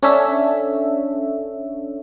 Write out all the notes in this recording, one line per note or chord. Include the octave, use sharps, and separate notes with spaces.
C#4 D4 A4 C#5 E5